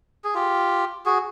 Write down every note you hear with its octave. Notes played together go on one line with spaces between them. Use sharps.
G#4
F4 G4
F#4 G#4